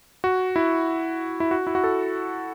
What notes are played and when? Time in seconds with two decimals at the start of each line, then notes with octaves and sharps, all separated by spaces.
0.24 F#4
0.56 E4
1.40 E4
1.51 F#4
1.67 E4
1.75 F#4
1.84 A4